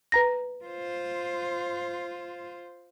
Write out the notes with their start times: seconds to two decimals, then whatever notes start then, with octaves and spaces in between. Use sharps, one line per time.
0.12 B4 A#5 A#6
0.64 F4 C5